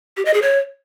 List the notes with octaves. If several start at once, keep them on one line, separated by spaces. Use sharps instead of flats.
G4
D#5
G#4
C#5